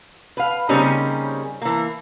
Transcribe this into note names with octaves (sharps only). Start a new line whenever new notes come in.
B4 F5
C#3 G3 A#3 C4 C#4 D#4
E3 A#3